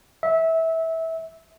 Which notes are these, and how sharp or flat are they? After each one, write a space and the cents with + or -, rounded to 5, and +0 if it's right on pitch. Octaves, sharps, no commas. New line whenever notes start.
E5 -20